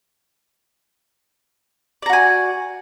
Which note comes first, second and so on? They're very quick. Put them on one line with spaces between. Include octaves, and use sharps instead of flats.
D5 A#5 F#4 G#5